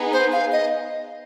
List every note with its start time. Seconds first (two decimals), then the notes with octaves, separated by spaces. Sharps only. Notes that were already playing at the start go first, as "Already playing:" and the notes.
Already playing: B3 D#4 G#4
0.13 C5
0.32 F5
0.52 D#5